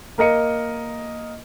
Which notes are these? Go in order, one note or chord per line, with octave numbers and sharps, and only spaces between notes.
A#3 A#4 D#5 C#7